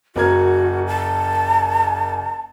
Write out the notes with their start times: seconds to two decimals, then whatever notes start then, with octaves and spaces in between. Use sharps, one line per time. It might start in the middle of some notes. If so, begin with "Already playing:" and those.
0.16 F#1 F#4 A#4 G#6
0.87 A5